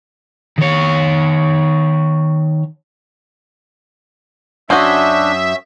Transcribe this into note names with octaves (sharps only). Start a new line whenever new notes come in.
D#3 C#5
F#2 C#4 D4 F#4 C5 D#5 E5